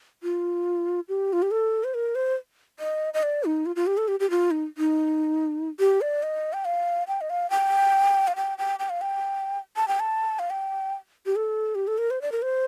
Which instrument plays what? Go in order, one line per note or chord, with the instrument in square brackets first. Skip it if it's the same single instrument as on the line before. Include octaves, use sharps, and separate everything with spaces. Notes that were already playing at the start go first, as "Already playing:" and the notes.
[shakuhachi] F4
G4
F4
G4
A4
C5
A#4
C5
D#5
D#5
D5
D#4
F4
F4
G4
A4
G4
G4
F4
D#4
D#4
G4
D5
D#5
G5
F5
G5
D#5
F5
G5
F5
G5
G5
G5
F5
G5
A5
G5
A5
F5
G5
G4
A4
G4
A4
A#4
C5
D5
A#4
C5